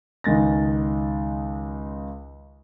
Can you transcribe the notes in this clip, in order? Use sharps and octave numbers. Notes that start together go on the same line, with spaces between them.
C#2 D#3 G#3 A6 A#6